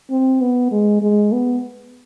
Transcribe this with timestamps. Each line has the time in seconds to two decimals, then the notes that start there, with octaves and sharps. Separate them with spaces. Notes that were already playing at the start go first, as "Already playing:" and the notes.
0.11 C4
0.41 B3
0.72 G#3
1.02 G#3
1.32 B3